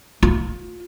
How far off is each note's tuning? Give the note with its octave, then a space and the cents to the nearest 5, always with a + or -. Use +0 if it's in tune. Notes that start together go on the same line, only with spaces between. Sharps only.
F4 +30